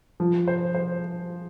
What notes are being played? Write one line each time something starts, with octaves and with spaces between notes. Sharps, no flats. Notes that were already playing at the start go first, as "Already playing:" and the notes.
F3
C5
C5